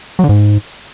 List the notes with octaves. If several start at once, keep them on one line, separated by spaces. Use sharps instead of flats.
F#3
D3
G#2